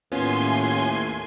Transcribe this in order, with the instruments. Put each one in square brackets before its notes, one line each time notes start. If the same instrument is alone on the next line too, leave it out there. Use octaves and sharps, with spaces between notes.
[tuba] D#2 [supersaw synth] A2 [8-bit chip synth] B3 C#4 F4 [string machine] G#5 C6